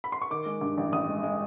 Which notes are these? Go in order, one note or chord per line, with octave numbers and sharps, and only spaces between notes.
B5
C6
C#6
D#3 D6
G#3
G2
A1
A1 D#6
G#3
G#3